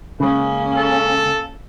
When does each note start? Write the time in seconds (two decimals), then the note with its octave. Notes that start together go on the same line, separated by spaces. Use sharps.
0.20 C#3 G#3 A#3 C#4
0.78 A4